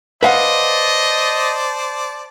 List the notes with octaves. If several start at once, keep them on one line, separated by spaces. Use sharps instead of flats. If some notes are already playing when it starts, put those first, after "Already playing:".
B4 C5 D5 D#5 F5 F#5 A5